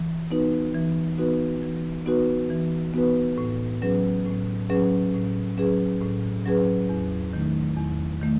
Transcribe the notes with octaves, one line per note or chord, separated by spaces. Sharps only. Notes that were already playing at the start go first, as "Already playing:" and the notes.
Already playing: E3
B3 D#4 F#4 B4
E3
B3 D#4 F#4 B4
E3
B3 D#4 F#4 B4
E3
B3 D#4 F#4 B4
A2
F#3 C#4 G#4 B4
A2
F#3 C#4 G#4 B4
A2
F#3 C#4 G#4 B4
A2
F#3 C#4 G#4 B4
E2
D#3 A3 D#4
E2
D#3 A3